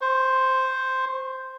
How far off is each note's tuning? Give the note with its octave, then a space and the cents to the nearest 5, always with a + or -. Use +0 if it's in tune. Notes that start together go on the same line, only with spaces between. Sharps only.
C5 +0 C#6 -40